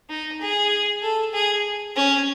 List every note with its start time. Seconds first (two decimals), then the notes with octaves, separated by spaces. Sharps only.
0.09 D#4
0.40 G#4
1.02 A4
1.33 G#4
1.96 C#4